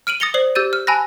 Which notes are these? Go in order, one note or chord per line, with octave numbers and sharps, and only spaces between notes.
F6 D7 D#7 F#7
D#6 A6 A#6 C#7 F7 G7
C5 D5 D#6 C7 F#7
G4 E6 G6 A6 D#7
F6
G#5 A5 B5 E6 F#6 A#6